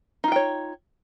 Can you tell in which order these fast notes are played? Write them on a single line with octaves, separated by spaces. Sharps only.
D#4 F4 G5 C#5